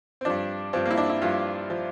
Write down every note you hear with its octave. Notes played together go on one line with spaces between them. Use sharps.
C4
G2 F3 D4
G2 F3 C4
A#3
E4
D4
E4
G2 F3 F4
F3